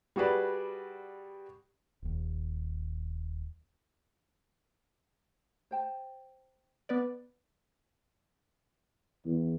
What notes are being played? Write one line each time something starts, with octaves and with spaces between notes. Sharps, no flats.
G3 F#4 G#4 B4 D5
D#1 D#2
C5 G5 A5
B3 B4 D5
E2